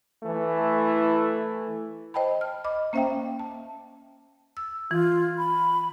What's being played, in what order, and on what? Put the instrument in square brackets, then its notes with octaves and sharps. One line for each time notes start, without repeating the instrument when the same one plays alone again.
[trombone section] E3 A3 E4
[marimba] C5 D#5 G5 A5 B5
F6
D#5 B5 D6
A#3 C#4 C5 E5 F5 G5
A5
E6
[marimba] E3 [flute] F4
[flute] B5